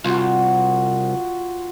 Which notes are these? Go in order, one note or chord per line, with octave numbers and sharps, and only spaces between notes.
C2 F4 F#4